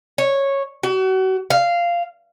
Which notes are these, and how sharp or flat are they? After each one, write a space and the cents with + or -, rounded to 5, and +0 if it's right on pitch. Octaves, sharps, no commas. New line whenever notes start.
C#5 -10
F#4 +35
F5 -10